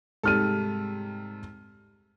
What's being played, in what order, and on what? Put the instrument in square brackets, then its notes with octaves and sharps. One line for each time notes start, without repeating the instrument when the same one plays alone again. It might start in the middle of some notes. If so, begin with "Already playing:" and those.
[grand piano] G#2 F6 D#7 [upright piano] C3 G3 A4